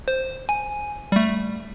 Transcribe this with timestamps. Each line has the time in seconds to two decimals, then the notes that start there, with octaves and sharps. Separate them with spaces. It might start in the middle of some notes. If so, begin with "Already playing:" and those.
0.08 C5
0.49 G#5
1.12 G3 A3